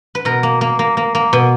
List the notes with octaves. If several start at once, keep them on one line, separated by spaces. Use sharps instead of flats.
B4
B2 A#4
A#3
A#3
A#3
A#3
A#3
B2